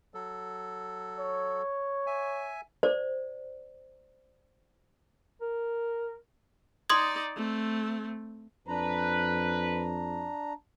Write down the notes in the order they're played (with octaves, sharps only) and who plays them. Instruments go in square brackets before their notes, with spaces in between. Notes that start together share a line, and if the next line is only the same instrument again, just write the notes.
[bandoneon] F#3 A4
[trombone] C#5
[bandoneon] E5 G#5
[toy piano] C5 D5
[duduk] A#4
[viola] D#4 D5 [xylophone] C6 D#6 G#6
[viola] A3 C4
[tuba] F2 [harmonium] D4 A#5 [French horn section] B4